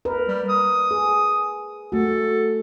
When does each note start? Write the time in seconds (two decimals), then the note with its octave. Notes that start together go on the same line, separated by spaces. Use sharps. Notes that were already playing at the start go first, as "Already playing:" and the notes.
0.05 A#4 B4
0.28 G3
0.49 D#6
0.91 G#4
1.92 A3 F#4 A4